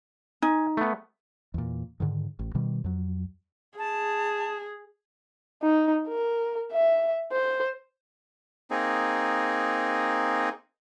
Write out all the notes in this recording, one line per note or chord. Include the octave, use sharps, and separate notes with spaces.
D#4 G#5
A3 B3
E2 A#2
G#2 D3 D#3
A1
B2 D#3 G3
F2 F#3
G#4 A5
D#4
A#4
E5
C5
A#3 C4 D#4 G#4